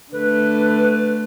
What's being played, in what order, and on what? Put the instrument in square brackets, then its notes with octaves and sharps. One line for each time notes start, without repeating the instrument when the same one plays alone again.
[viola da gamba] D3 A3 [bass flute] B4